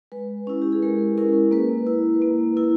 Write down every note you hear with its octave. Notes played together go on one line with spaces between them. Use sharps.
G#3 B4
C#4 E4
G4
G#4
G#3 A#4
C#4 E4 A#4
A#3 B4
E4
A#3
E4